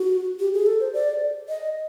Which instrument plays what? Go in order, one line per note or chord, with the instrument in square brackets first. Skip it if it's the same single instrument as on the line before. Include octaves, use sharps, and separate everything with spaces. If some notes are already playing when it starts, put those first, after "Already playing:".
Already playing: [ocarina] F#4
G4
G#4
A4
C5
D5
D#5